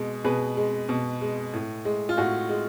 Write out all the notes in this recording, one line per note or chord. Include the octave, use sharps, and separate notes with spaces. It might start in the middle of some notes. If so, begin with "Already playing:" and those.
Already playing: B2 G#3
B2 G#4 B4
G#3
B2
G#3
A2
G#3
F4
A2 F#4
G#3